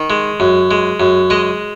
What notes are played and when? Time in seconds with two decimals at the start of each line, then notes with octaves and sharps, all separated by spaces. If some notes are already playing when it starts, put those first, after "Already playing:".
Already playing: D#3
0.10 G#3
0.40 F#2
0.71 G#3
1.00 F#2
1.30 G#3 D#5